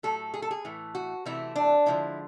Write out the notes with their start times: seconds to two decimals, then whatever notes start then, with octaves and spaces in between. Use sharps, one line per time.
0.03 A2 F#3 A3 A4
0.34 G#4
0.42 A4
0.51 G#4
0.65 A2 E3 A3
0.95 F#4
1.25 C3 E3 A3 E4
1.56 D4
1.86 D3 F3 G#3 E4